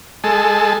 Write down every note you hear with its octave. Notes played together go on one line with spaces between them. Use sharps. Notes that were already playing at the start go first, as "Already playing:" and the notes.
G#3 A4